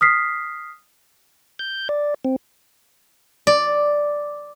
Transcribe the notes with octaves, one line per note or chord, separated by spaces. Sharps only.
D#6 F6 B6 C7
G6
D5
C4
D5